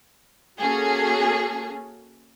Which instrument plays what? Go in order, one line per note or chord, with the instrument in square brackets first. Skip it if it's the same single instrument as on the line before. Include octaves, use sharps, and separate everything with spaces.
[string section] A#3 C#4 F#4 G#4 A4